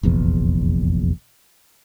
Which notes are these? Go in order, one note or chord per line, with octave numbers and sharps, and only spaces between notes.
F1 A#1 E2